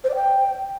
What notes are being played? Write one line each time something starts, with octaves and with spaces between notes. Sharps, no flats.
C5
D5
G5